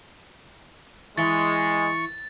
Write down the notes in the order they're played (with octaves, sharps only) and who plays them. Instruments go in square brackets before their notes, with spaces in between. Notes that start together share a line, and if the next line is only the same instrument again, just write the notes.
[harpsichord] E3 [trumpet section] G#3 [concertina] C#6 [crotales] A6